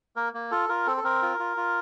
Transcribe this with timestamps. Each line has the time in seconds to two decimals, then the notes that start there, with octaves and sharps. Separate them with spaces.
0.16 A#3 A#4
0.34 A#3
0.51 F4 A4
0.69 F4 A#4
0.86 C4 A4
0.97 A4
1.04 C4 A#4
1.22 F4
1.39 F4
1.57 F4